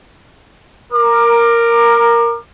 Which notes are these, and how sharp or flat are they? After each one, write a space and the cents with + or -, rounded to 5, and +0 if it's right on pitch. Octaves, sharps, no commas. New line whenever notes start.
A#4 +0 D6 +25